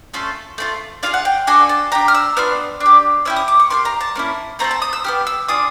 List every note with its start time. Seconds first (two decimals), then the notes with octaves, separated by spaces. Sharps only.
0.14 A3 C#4 F4 A4
0.58 A3 D4 F4
1.03 D4 F4 G#4 F5
1.14 F#5
1.25 G5
1.47 D4 F#4 A4 G#5
1.69 A5
1.92 D4 G4 A#5
2.08 F6
2.15 E6
2.37 B3 D4 F4 F6
2.80 D4
2.86 G4
3.25 C#4 E4 G4 E6
3.36 D#6
3.48 D6
3.60 C#6
3.70 A#3 D4 G4 C6
3.85 A#5
4.01 A5
4.15 A#3 C#4 E4
4.59 A3 C4 F4 A4 A#5
4.71 A5
4.82 D#6
4.93 E6
5.04 B3 D#4 G4 F6
5.27 E6
5.48 D4 F4 G#4 D#6